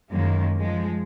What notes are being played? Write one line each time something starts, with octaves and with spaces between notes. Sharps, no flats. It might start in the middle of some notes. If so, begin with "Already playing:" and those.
F#2 D#3 G#3 A#3
F3 G#3